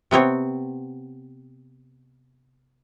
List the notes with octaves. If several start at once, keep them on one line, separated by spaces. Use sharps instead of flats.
C3 B3 C4 C#5